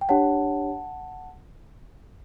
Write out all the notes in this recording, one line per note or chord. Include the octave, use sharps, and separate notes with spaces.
G5
D4 G4 C#5 F#5 A5